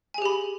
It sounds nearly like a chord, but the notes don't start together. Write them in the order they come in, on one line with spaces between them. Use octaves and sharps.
G#5 G#4 G4 B5